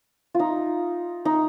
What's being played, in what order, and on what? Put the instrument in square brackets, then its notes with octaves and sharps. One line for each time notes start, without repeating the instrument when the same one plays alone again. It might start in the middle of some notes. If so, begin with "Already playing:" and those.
[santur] D#4 F4
D#4